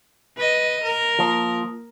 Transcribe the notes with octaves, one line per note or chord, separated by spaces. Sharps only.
B4 D#5
A#4
F3 A#3 D#6